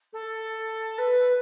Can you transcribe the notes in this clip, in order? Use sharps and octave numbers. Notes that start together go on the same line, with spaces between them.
A4
B4